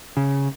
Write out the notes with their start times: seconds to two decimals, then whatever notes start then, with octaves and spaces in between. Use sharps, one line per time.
0.17 C#3